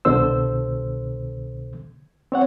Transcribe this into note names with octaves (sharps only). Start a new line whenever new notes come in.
C2 B2 D3 A4 C5 E6
C4 C#5 F#5